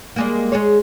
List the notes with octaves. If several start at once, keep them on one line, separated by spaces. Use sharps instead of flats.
G3 G#3 A#3
G#3 G#4 C#5